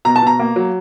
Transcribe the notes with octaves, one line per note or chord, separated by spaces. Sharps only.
B2 A#5
A5
B2 A#5
A#3
F#3